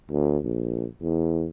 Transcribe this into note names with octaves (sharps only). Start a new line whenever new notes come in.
D2
A#1
E2